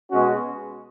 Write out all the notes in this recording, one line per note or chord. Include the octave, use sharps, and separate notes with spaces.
B2 G#3 C#4 F#4